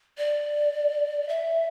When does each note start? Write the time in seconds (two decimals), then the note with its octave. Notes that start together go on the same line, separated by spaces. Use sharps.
0.18 D5
1.29 E5